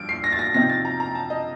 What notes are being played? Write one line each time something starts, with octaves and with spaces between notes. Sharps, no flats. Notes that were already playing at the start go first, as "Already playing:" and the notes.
Already playing: G2 F3 F4 D7
C7
A#6
A6
A#6
C3 F3 C4 D#4 A#6
A6
A#5
A#5
A5
D#5